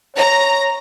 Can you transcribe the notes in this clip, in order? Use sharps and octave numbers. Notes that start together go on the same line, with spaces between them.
C#5 A#5